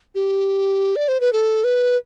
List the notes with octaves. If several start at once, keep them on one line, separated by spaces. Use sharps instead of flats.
G4
D5
C5
B4
A4
B4